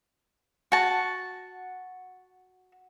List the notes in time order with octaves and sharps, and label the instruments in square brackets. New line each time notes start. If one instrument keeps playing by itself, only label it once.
[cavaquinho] F#4 A5